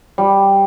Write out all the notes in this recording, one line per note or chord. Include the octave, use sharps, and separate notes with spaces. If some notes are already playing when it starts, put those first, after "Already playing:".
G3